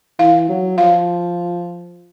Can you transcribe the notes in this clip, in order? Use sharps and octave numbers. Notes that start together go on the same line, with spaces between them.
E3 F5
F#3
F3 F5